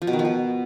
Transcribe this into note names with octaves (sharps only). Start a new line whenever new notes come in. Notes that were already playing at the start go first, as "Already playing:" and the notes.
F3
B2
D#3
F3
B2